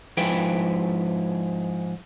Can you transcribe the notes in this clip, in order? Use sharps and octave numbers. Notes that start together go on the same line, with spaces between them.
G#2 F3 E4 G#4 B4 G5